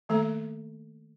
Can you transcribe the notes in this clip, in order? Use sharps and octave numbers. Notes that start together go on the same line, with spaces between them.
D#3 A3 A#3 A4 A#5